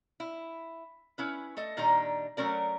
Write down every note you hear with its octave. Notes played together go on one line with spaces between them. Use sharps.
E4
C#4 E4 B4
A3 A4 D#5
A#2 D#3 G3 D4 D#5 A#5
F#3 A3 C#4 A#4 D5